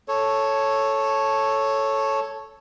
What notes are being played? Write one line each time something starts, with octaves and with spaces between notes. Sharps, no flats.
A4 C#5